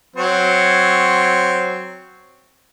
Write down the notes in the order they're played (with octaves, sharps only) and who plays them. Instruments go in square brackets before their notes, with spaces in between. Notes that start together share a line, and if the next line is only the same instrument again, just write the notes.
[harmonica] F#3 C4 C#5